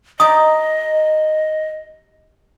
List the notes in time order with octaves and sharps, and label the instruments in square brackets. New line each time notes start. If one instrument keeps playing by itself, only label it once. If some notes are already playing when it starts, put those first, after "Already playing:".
[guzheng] D#4 G4 D5 [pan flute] D#5 [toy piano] D#6